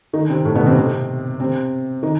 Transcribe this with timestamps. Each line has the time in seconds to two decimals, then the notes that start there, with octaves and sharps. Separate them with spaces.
0.13 D#3 D#4
0.29 C3 C4
0.45 A2 A3
0.55 B2 B3
0.66 C3 C4
0.76 C3 C4
1.40 C3 C4
2.03 D#3 D#4